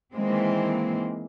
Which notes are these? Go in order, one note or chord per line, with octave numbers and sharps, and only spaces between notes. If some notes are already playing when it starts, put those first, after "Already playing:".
D#3 E3 G#3 A#3 C4